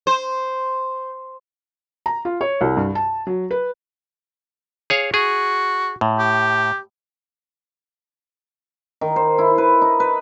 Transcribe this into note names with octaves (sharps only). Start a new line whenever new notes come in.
C5
A#5
F4
C#5
C2
G2
A5
F#3
B4
G#4 C#5 F5
F#4 G#4
A2
G4
D#3
C5
E4
B4
D#4
B4